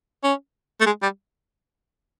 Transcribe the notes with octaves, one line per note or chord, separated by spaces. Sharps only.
C#4
A3
G#3
G3